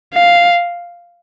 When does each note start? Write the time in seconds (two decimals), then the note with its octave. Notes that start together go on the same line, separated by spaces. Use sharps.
0.14 F5